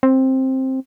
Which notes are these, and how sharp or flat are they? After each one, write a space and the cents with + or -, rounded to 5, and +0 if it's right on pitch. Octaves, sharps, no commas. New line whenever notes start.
C4 +10